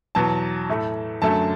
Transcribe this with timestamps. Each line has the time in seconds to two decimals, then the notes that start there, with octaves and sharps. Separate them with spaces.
0.15 E2 B2 F#3 A5
0.69 A2 A3
1.22 F#2 D3 F#3 A3 A5